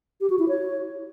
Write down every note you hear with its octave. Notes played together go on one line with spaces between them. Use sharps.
G4
F#4
E4
C#5